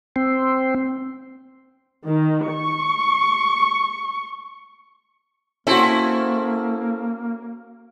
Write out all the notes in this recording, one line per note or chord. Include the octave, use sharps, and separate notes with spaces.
C4
D#3
C#6
A#3 C4 C#4 E4 F#4 A4